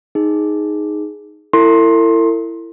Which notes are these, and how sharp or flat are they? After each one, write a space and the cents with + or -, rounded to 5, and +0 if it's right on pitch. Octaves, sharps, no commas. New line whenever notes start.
D#4 +0 G#4 +0
E4 +20 A4 +45 C6 +20